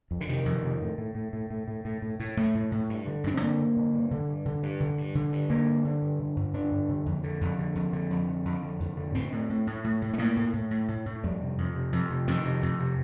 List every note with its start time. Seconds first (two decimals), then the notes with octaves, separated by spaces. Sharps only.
0.11 F2
0.21 D3
0.29 C3 D#3
0.45 F2
0.63 C3
0.81 A2
0.98 A2
1.15 A2
1.33 A2
1.50 A2
1.68 A2
1.85 A2
2.02 A2
2.20 A2
2.37 A2 A3
2.55 A2
2.72 A2
2.89 G2
3.07 D3
3.24 G2 D4
3.34 C4
3.41 D3 A#3
3.59 G2
3.76 D3
3.93 G2
4.11 D3
4.28 G2
4.45 D3
4.63 G2
4.80 D3
4.97 G2
5.15 D3
5.32 G2
5.50 D3 A#3
5.67 G2
5.84 D3
6.02 G2
6.19 D3
6.36 G2
6.54 D3 D4
6.71 G2
6.89 D3
7.06 F2
7.23 D3
7.41 F2
7.58 D3
7.75 F2
7.93 D3
8.10 F2
8.28 D3
8.45 F2
8.62 D3
8.80 F2
8.97 D3
9.15 A2 C4
9.32 A2
9.50 A2
9.67 A2
9.84 A2
10.02 A2
10.14 A3
10.18 A2 A#3
10.37 A2
10.53 A2
10.71 A2
10.88 A2
11.06 A2
11.24 F2 G3
11.41 C3
11.58 F2
11.75 C3
11.92 F2
12.10 C3
12.28 F2 D#3
12.45 C3
12.62 F2
12.80 C3